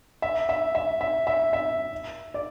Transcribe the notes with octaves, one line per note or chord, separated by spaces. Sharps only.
E5
E5
E5
E5
E5
E5
D5